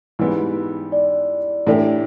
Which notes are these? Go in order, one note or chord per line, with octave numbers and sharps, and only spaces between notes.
G#2 E3 G3 B3
D5
A2 E3 A3 D4 G4